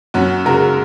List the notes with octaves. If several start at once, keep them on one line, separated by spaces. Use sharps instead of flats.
F#2 C#4 F#4
C#3 G#3 F#4 A#4